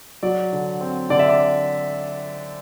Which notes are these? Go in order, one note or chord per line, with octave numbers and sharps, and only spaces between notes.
F#3 D5
D3
C4
D3 D5
E5
D5